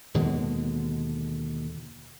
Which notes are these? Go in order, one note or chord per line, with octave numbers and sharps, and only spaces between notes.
D#2 B2 D3 G#3